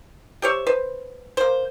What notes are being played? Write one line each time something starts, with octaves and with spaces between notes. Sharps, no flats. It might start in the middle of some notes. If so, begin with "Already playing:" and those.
G4 C5 C#5 E5
B4 C5
A#3 C5